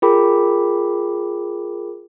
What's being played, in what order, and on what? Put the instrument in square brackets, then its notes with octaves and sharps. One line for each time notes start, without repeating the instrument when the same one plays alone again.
[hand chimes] F4 G#4 A#4 G5 B5 D6